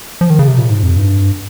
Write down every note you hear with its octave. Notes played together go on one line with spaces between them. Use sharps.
F3
D#3
C#3
C3
A#2
G#2
F2
G2